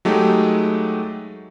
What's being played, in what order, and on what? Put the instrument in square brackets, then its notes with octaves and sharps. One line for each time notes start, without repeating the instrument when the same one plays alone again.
[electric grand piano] F#3 G#3 A3 D#4 G4